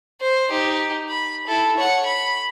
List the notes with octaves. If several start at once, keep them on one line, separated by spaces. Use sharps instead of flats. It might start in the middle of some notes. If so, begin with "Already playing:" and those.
C5
D#4 G4
B5
E4 A4
C#5 F#5
B5